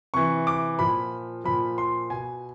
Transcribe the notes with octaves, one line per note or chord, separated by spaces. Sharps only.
C3 E3 C#6
D6
A#2 F3 B5
A#2 F3 B5
C6
B2 G#5